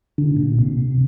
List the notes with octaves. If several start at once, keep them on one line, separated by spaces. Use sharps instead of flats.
D3
A#2
C3